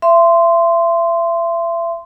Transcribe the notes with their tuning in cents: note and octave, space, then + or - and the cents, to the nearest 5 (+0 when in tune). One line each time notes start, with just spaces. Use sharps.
E5 +35 C6 -10